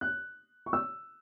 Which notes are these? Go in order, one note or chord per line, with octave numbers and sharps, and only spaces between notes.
F#6
C#6
E6